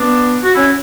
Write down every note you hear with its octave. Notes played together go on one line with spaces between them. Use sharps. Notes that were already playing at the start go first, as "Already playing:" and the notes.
Already playing: B3 D4
F#4
C#4 E4